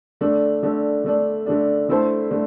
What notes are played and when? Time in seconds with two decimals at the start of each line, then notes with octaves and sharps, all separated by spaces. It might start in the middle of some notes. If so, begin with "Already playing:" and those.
0.21 D3 A3 D4
0.63 D3 A3 D4
1.04 D3 A3 D4
1.46 D3 A3 D4
1.89 D3 A3 E4 A4 C5
2.31 D3 A3